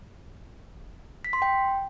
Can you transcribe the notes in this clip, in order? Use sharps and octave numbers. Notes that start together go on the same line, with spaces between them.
B6
C6
G5